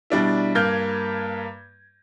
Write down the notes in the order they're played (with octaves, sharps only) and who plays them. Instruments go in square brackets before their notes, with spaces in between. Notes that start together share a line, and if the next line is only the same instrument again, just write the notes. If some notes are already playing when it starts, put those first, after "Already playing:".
[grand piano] B2 G3 D4 E4
G2 A#3 F6 G6 G#6